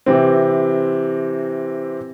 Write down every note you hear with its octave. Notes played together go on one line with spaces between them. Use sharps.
C3 E3 C4